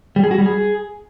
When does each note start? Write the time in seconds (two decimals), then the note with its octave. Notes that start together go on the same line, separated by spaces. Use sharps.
0.16 G3
0.24 G#4
0.31 F#4
0.38 G3
0.46 G#4